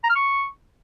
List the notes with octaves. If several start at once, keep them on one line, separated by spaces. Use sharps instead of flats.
A#5
F6
C#6